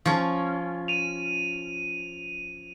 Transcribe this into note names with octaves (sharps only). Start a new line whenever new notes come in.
F3 C#4
D#7 F7